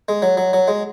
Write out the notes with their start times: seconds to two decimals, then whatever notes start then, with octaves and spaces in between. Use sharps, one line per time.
0.08 G#3
0.22 F#3
0.37 F#3
0.53 F#3
0.68 G#3